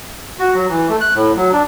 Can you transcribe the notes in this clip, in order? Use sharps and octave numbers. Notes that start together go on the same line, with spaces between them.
F#4
F#3
E3
A3
F#6
A2
F#3
D4